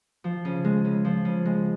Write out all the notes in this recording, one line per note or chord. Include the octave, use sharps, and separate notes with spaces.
F3
C#3
G#3
C#3
F3
C#3
G#3